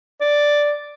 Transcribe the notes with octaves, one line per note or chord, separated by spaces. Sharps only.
D5